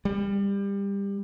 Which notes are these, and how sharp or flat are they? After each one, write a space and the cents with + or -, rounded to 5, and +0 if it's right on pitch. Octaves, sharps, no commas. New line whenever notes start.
G3 +25